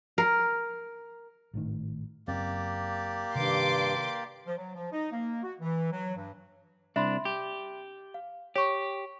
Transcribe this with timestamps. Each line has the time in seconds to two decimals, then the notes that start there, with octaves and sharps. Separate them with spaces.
0.18 A#4
1.54 G#1 A2 D#3
2.28 F#1 F#2 A#3 C4 G4 D5
3.35 G2 C3 D#3 C6 D6
4.46 F3
4.58 F#3
4.75 F3
4.92 D#4
5.12 A#3
5.43 F#4
5.60 E3
5.92 F#3
6.16 G2
6.96 C2 D4 E5 B5 C6
7.25 G4
8.14 F5
8.56 G4 C#5 C#6